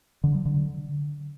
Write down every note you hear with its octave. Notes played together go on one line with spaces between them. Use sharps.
D3
F#3
D3